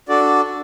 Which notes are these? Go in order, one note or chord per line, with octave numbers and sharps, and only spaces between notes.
D4 F#4 A4 D5